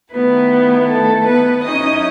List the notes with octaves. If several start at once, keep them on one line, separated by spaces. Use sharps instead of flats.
D#3 A3 B3 E4 B4
A3 A4
B3 B4
F#3 C#4 D#4 E4 D#5